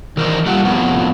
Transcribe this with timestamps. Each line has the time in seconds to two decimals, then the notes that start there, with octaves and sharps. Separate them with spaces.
0.17 D#3 E3 A#4 C5 D5
0.46 G3 A3 A#3 F4 F#5
0.65 F2 A2 F#3 B3 F#4